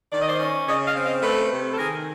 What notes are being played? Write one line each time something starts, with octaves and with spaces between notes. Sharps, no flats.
D#3 D5
D#5
C5 D5
C#4
C#3 C#5 D#5
D#5 F5
C4
D#5 F5
A3 A4 B4
C3
A4
D#3 G#4 A#4